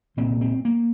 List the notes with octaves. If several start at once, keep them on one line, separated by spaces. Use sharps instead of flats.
C2 A#2 C4
C4
A#3